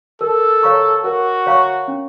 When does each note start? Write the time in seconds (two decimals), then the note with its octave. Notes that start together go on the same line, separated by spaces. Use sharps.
0.21 A4 A#4
0.63 C#5 F5 A#5 C#6
1.04 F#4 A#4
1.46 C#5 F5 A#5 C#6
1.88 C#4